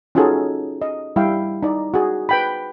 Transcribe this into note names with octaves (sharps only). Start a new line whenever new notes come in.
C#4 D#4 F4 F#4 G#4 A4
D#5
G3 E4 F5 G5
D#4 D5
F#4 G#4
B4 G5 B5